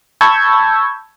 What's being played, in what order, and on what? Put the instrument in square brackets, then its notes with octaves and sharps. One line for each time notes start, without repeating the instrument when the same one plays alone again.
[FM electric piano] A5 B5 C#6 E6 G6 G#6